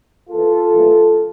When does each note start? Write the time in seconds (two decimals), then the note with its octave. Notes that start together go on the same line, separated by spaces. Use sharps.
0.30 E2 E3 A#3 F4 A4
0.72 A#1 A2 E3 G3 A#3